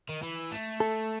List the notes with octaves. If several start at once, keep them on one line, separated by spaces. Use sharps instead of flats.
D#3
E3
A3
A4